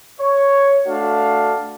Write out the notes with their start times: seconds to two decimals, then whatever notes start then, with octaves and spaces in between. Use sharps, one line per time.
0.21 C#5
0.88 A3 D4 F#4 F5